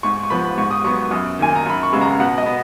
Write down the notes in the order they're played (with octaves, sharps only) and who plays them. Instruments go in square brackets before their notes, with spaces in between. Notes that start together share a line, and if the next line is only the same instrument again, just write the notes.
[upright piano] G#2 C#6
C#6
F3 B3 B5
G#2 C#6
D#6
F#3 B3 C#6
F#2 D#6
D#3 A#3 G#5
A#5
F#2 B5
C#6
C#3 G#3 B3
A#5
B2 F#5
D#5
B3